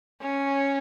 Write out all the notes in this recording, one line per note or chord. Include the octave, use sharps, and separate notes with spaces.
C#4